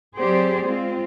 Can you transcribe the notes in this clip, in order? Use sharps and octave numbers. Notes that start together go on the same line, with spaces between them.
F#3 C4 G4 G#4 C5 D5
G#3 C4 F4